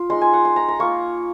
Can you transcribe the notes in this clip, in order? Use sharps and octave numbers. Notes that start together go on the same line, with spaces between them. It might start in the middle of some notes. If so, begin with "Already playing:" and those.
Already playing: F4
G#3 D#4 C6
G#5
F#5
C6
A#5
A#5
A#3 F4 C#6